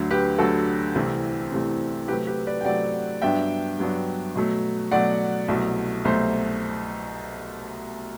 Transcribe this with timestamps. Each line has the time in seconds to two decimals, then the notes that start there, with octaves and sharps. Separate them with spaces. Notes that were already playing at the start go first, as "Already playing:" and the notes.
Already playing: D2 D3 F#3
0.11 G4 B4
0.39 D2 D3 F#3 F#4 A4
0.95 C2 C3 E3 A3 C4
1.51 C2 C3 E3 A3 C4
2.08 C3 F#3 A3 G4 B4
2.27 G4 B4
2.47 B4 D5
2.61 G5
2.65 C3 F#3 A3 D5 F#5
3.22 G2 F#3 B3 D4 E5 G5
3.79 G2 F#3 B3 D4
4.35 B2 F#3 A3
4.92 B2 F#3 A3 D5 F#5
5.48 C2 B2 F#3 A3
6.05 C2 B2 F#3 A3 C5 E5